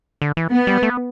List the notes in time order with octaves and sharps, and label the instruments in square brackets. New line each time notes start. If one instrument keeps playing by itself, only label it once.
[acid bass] D3
E3
[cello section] B3
[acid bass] G3
A3
B3